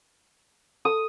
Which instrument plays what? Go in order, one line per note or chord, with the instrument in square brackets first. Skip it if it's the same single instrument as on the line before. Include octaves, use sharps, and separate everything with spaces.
[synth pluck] A4 [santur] D#6